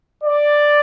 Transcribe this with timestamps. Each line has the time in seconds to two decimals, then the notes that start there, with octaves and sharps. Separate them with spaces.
0.24 D5